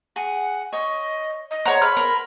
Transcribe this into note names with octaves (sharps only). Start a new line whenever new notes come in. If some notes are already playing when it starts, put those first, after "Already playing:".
G#4 F#5
C#5 D#5
D#5
C5 C#5 F#5 A#5 C6
B5 F6
A#4